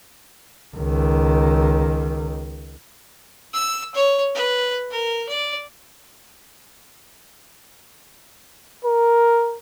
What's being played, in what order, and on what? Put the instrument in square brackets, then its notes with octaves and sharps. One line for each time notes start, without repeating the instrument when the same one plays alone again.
[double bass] C#2 D#3
[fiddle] E6
C#5
B4
A#4
D5
[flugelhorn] A#4